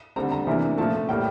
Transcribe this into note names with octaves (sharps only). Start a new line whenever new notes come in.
D3 G3 C4 A#5
A#5
C3 E3 A#3 D4
A#2 F3 A3 A5
A2 G3 A#3 G5